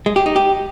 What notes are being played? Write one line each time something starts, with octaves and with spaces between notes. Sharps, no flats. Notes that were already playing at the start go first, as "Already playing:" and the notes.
G#3
G4
D#4
G4